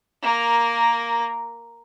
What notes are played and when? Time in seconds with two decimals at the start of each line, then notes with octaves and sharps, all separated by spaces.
0.22 A#3 A#4